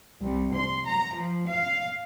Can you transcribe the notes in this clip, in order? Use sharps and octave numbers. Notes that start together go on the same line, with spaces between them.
C2
C6
A#5
F3
F5